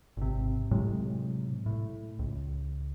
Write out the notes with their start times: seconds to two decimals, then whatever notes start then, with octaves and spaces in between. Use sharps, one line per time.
0.17 G#1 C3
0.71 A2 C3 F#3 G#3
1.66 A2
2.19 C#2